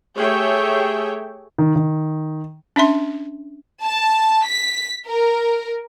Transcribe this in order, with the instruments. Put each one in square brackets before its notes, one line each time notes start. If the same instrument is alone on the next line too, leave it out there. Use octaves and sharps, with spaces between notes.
[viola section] A3 G4 G#4 C#5 E5 G5
[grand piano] D#3
D#3
[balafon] C#4 D4 E5 C6
[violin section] A5
B6
A#4